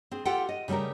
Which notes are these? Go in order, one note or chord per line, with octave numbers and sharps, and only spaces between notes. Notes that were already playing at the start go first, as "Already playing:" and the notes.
C4 G#4
F4 G4 A4 F#5 G5
D#5
C#3 G3 A3 G4 A#4